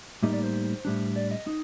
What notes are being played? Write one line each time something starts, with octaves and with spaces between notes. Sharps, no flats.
A2 G3 A#3 D#4 D#5
D5
C5
A2 G3 D4
D5
D#5
D#4